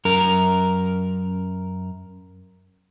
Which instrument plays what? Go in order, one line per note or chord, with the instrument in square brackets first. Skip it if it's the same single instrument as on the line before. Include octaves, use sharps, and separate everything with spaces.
[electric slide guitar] F#2 A#4